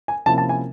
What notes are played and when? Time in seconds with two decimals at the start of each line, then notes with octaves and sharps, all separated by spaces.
0.08 G#5
0.26 C3 F3 A#3 C#4 E4 A5
0.38 A5
0.49 G#5